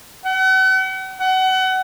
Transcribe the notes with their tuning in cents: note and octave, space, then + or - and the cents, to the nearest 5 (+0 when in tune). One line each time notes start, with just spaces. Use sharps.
F#5 +40
F#5 +25